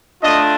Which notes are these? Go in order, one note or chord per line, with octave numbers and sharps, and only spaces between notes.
A3 D4 F4 D#5